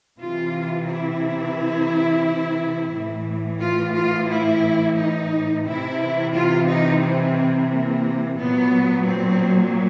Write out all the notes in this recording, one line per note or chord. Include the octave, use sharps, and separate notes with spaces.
C3 E3 F4
E4
A2 E3
F4
F4
E4
D#4
C3 E3 E4
F4
D#4
C4
A#3
A#2 F#3 B3
C4